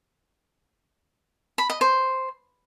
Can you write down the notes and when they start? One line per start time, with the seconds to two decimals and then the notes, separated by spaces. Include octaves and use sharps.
1.58 B5
1.70 D#5
1.81 C5